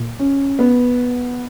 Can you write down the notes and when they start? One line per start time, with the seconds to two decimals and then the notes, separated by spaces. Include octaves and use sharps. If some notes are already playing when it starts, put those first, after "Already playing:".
Already playing: A#2
0.19 C#4
0.59 B3